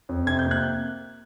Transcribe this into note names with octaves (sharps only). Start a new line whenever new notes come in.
F2
C3 G#6
G6
A#3
F#6 G#6